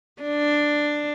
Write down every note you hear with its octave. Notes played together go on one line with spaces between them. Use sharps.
D4